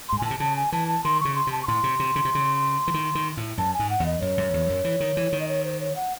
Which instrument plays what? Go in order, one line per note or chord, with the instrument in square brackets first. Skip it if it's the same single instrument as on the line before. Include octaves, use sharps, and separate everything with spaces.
[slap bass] G#2 [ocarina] C6
[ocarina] G#5
[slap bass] A2 [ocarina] A5
[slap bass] C3
[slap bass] C#3 [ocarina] A5
[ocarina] G#5
[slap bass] E3 [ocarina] A5
[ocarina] A5
[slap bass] D#3 [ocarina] C6
[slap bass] C#3 [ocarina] C#6
[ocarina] C6
[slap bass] C3 [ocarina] A5
[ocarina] C#6
[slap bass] A2 [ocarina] C6
[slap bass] C3
C3
C#3
C3
C#3
E3
D#3
D#3
A2
[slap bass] F#2 [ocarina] A5
[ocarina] G#5
[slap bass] G#2
[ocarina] F#5
[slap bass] E2
[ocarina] D#5
[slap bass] F#2 [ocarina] C#5
[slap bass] F#2
E2
F#2
E3
D#3
E3
D#3
[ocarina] D#5
C#5
C5
C#5
F#5